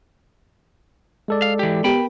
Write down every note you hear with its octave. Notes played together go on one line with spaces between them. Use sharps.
G#3 A4 D5
F5
E3 G4
B3 G4 A#4 G5 B5